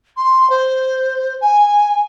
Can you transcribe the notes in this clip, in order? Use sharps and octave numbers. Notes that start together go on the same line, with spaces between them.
C6
C5
G#5